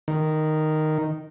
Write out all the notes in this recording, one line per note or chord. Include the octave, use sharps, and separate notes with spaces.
D#3